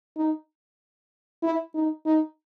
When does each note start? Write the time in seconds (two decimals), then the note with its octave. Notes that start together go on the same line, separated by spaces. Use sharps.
0.17 D#4
1.43 E4
1.74 D#4
2.06 D#4